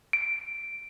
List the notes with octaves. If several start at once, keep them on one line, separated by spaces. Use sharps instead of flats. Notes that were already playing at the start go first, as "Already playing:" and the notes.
D7